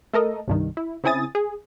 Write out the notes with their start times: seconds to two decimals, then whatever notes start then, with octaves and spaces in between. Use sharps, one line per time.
0.13 A3 A4 A#4 D#5
0.48 C2 G2 D#3
0.77 E4
1.04 C#3 C4 E4 G#5 D#6 A6
1.35 G#4